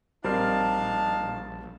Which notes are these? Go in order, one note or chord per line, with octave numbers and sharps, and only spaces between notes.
A#1 G3 C4 D4 D#4 A#4 F5 A5